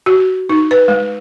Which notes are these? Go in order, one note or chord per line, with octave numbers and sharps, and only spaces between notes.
F#4
D#4
B4
G#3